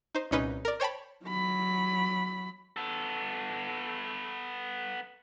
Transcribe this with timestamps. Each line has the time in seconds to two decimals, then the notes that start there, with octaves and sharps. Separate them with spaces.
0.15 D#4 C5
0.31 C2 A#2 C#4 D#4 B4
0.65 A#4 D5
0.80 C5 C#5 G5 A5 B5
1.25 F#3 B5
2.77 B3 A4